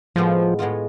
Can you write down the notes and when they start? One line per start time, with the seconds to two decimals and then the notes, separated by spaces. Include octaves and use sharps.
0.16 A2 F3 G#3 B3 F4
0.59 A2 G#3 B3 F4